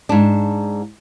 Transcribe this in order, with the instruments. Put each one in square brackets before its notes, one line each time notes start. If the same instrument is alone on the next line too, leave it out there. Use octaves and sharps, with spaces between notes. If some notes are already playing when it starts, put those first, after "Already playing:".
[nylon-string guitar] G#2 D4